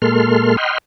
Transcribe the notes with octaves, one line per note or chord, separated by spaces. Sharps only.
A#2 G#3 A#3 A4 C6 F6
D#5 F#5 G5 B5 C6 F6